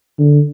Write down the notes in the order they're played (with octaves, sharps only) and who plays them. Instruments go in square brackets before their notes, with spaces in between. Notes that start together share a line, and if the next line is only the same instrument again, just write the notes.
[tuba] D3